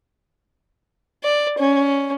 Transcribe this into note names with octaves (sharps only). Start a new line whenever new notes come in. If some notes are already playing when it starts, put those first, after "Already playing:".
D5
C#4